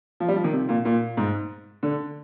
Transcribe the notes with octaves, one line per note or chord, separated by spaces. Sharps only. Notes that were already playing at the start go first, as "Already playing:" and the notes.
F3
G3
F3
D#3
C3
A#2
A#2
G#2
D3